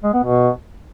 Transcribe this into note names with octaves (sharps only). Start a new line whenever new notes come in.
G#3
B3
B2